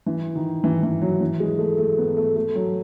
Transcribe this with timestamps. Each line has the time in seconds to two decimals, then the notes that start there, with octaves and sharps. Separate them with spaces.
0.06 E3
0.35 D#3
0.64 E3
0.83 E3
1.02 F#3
1.21 E3
1.40 G#3
1.59 A3
1.78 A3
1.98 B3
2.17 A3
2.36 A3
2.56 F#3